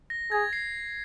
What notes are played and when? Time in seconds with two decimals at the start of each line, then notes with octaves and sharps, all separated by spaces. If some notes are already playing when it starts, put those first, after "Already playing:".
0.10 A#6
0.32 G#4 G#6
0.53 C7